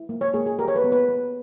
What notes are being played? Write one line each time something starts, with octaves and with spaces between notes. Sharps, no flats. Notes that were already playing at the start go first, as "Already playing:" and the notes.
Already playing: E4
A#3
C#5
A#3 G#4
G#4
G4 A#4
C#5
B4
B3
B4
B3